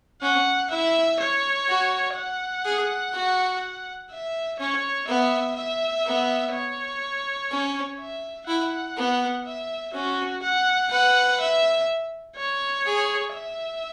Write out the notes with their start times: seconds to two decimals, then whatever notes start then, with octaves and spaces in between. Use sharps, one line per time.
0.22 C#4 F#5
0.71 E4 E5
1.20 C#5
1.68 F#4
2.16 F#5
2.65 G#4
3.14 F#4
4.11 E5
4.60 C#4 C#5
5.08 B3 E5
5.57 E5
6.05 B3
6.53 C#5
7.51 C#4
8.00 E5
8.48 E4 F#5
8.97 B3
9.46 E5
9.94 C#4 F#4
10.43 F#5
10.91 B4 F#5
11.40 E5
12.37 C#5
12.86 G#4
13.34 E5